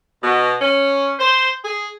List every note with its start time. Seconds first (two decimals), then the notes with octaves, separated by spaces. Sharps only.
0.23 B2
0.61 C#4
1.19 C5
1.64 G#4